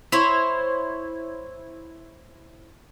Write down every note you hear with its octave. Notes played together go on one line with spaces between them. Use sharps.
E4 C5 C#5